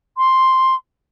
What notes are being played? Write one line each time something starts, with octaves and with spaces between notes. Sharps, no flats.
C6